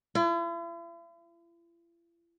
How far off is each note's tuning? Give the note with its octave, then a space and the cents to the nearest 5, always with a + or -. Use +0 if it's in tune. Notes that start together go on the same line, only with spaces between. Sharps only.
E4 +45